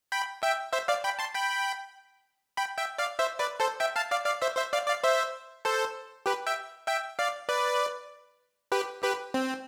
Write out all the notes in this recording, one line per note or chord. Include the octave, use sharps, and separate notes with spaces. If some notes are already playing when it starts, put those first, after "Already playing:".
G5 B5
E5 G5
C5 E5
D5 F5
G5 B5
A5 C6
G5 B5
G5 B5
E5 G5
D5 F5
C5 E5
B4 D5
A4 C5
E5 G5
F5 A5
D5 F5
D5 F5
C5 E5
C5 E5
D5 F5
D5 F5
C5 E5
A4 C5
G4 B4
E5 G5
E5 G5
D5 F5
B4 D5
G4 B4
G4 B4
C4